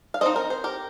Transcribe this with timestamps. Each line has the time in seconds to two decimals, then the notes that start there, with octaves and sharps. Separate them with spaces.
0.14 F5
0.21 G3 C4 D#4 C5 D#5
0.36 A#4
0.50 C5
0.64 G4 A#4